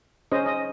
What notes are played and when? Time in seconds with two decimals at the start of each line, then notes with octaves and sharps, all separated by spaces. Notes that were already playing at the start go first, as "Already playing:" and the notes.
0.32 C#4 G#4 C5 D#5
0.46 D#5